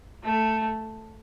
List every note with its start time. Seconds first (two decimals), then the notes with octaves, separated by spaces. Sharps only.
0.23 A3